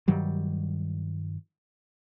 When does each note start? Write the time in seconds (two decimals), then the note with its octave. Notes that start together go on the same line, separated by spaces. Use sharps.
0.08 G2 D#3 F#3 G3